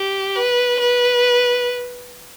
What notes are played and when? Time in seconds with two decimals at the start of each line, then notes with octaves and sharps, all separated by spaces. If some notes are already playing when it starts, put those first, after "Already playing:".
Already playing: G4
0.36 B4
0.79 B4